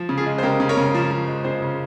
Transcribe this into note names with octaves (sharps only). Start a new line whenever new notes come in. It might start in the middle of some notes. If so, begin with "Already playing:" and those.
Already playing: F3
C#3
F4 G#4
G#3
C5
C#3 G4 A#4
C#3
A#4 C#5
C#3
F3
F3
G#3
C#3 G#4 C5
C#3